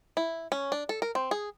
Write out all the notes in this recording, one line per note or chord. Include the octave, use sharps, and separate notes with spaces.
E4
C#4
D4
A4
A#4
C4
G#4